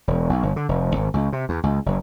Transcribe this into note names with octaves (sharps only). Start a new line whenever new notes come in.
E1
B1
G1
D3
F1
G#1
C#2
C3
E2
C#2
F#1